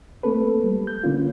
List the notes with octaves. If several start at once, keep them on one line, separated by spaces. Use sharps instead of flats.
A3 A#3 C4 A4 B4
G3
G6
D3 A#3 C#4 F4